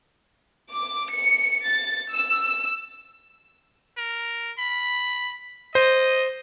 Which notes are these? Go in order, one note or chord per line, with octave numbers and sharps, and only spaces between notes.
D6
C#7
A6
E6
A#4
B5
C5 D#5